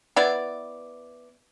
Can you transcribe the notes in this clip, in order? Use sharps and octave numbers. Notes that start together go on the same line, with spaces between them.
B3 E4 D5